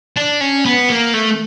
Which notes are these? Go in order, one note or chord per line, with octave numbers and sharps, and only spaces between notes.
D4
C#4
B3
A#3
A3